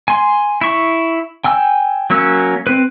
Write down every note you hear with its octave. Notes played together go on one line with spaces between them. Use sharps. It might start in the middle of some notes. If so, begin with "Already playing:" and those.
G#5 C6
E4 C#6
G5 G#5 E6
F#3 A#3 C#4 E6
C4 B4